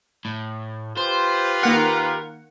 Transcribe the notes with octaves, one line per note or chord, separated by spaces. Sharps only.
A2
F4 G4 B4 C5
D#3 A#3 A#4 F#5